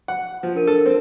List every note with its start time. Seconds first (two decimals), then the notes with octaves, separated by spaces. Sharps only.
0.08 F#5
0.43 F3
0.55 D4 A#4 D#7
0.67 A4
0.86 C4